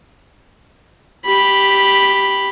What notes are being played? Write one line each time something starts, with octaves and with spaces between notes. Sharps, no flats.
G4 B5